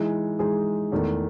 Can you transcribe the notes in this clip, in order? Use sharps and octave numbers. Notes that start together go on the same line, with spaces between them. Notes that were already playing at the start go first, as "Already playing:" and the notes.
Already playing: E3 G#3 D#4 G#4
E3 G#3 D#4 G#4
E2 D#3 A3